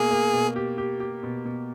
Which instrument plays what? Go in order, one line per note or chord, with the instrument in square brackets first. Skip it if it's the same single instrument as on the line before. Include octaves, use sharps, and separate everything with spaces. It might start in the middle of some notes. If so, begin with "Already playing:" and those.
Already playing: [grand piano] B2 A#3 [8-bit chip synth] G#4
[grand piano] A#3
B2
G4
G4
G4
B2
B2